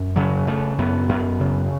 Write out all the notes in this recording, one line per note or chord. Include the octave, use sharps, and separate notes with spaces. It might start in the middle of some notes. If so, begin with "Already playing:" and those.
Already playing: F#2
C#3 F#3
C#3 A3
F#2 B3
F#2
C#3